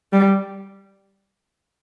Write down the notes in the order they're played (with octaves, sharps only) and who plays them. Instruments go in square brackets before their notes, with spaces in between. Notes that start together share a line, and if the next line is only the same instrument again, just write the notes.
[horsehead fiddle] G3